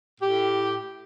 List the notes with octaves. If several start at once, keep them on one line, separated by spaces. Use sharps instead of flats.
A2 G4